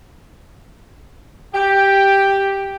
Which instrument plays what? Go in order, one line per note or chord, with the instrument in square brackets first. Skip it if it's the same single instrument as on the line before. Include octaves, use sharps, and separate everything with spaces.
[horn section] G4 [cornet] G5